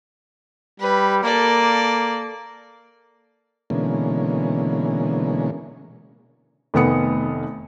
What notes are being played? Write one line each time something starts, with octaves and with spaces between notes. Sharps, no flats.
G3 B4
A#3 A4 D5
B2 D3 E3 G#3 A#3 C#4
F1 D#3 A3 B3 D#6 C#7